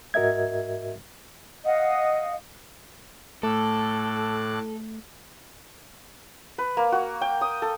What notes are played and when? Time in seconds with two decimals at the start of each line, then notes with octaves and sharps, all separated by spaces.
0.14 G#2 F#4 A#4 D#5 E5 G#6
1.65 D#5 F5 F#5 D#6
3.43 A2 A3 A4 D6 F#6
6.58 B4
6.77 A#3
6.92 F#4
7.21 G5
7.41 D#6
7.62 A4